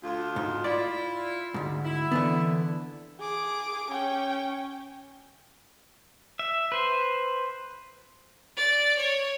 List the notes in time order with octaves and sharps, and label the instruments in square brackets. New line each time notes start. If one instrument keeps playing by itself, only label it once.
[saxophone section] D2 F4
[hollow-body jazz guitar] G#2
[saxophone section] E4 F4 [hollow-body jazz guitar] D5
[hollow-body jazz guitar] D2 G#2
[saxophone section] E4
[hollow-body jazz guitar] D3 E3 B3
[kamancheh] G#4 D6
C#4 G5
[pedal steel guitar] E5
B4 C5
[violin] D5
C#5